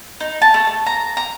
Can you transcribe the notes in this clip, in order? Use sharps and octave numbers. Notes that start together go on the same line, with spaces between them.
D#4
A5
A3
A5
A#5
A#5